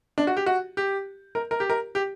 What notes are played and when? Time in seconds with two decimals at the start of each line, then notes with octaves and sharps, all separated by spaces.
0.18 D4
0.27 F#4
0.37 G4
0.46 F#4
0.77 G4
1.35 A#4
1.51 A#4
1.60 G4
1.70 A#4
1.95 G4